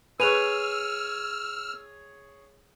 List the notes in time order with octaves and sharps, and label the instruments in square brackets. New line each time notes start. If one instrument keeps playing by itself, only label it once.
[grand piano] G#4 C#5 [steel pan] B4 [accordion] E6 F6 [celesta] D#7 F7